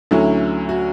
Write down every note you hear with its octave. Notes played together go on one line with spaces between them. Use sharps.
D2 D3 F#3 C#4 E4
F#4